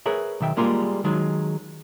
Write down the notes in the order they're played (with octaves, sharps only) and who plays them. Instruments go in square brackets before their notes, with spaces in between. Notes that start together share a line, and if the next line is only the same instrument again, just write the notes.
[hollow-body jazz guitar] G#4 A#4 B4 C#5 E5
B1 D#3 E5 G5
G3 G#3 A#3 F4 G#4 A#4
D#3 F#3 G#3